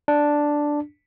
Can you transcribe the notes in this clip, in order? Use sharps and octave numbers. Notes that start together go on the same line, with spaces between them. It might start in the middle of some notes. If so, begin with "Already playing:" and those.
D4